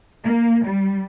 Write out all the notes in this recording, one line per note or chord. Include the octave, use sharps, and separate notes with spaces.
A#3
G3